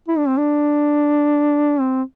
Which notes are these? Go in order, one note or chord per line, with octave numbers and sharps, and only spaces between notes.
E4
D4
C4
D4
C4